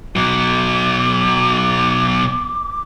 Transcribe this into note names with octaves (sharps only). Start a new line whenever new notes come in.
B2 F#3 D6